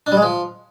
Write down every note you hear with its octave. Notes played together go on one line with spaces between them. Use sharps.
D4
G3
G#3
F3